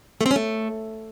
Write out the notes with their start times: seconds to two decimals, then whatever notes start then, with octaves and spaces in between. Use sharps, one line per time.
0.21 A3
0.26 C4
0.31 C#4
0.36 A3